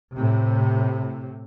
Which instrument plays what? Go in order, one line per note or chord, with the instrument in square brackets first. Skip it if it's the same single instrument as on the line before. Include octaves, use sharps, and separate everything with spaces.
[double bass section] A2 C3